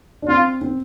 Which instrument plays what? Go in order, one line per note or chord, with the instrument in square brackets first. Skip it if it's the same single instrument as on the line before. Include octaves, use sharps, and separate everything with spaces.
[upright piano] D4
[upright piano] C4 [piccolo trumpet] F4
[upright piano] C4